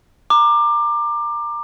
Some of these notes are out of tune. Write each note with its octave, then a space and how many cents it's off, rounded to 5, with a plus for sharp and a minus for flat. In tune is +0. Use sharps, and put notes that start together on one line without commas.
A#5 +0 D6 +20